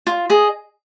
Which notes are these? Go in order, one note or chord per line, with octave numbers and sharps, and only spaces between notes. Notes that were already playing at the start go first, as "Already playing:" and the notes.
F4
G#4 D#5